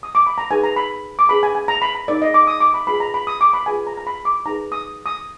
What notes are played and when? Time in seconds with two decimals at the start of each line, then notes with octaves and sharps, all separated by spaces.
0.03 D#6
0.15 D6
0.27 B5
0.38 A#5
0.51 D#4 G#4 B4 G#5
0.64 A#5
0.76 B5
1.19 D6
1.29 D4 G#4 B4 B5
1.43 G#5
1.55 G#5
1.68 A#5
1.82 B5
1.95 A#5
2.08 D#4 A#4 D5
2.22 D#5
2.34 D6
2.47 D#6
2.60 D6
2.74 B5
2.87 F4 G#4 B4 B5
3.00 A#5
3.14 B5
3.27 D#6
3.41 D6
3.53 B5
3.66 F4 G#4 B4 G#5
3.87 A#5
3.97 A#5
4.07 B5
4.25 D6
4.46 D#4 G#4 B4 A#5
4.72 D#6
5.06 D#6